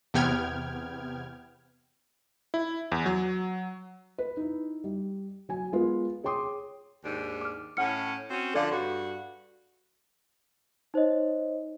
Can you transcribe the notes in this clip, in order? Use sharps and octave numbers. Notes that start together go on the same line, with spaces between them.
E2 C3 B3 G5 F6 G#6
E4
E2
F#3
B4
D#4 E4
G3
F#3 G#5
G#3 B3 F4 A#4 B4
G#4 C#5 G5 C6 D6 D#6
D#2 G#2 D4
D6 F6
A2 C#4 F#5 F6 C#7
C4 C#4 F#4
D3 F3 C#4 A4 D5 F5
G2 F#4
D#4 C5 C#5 D#5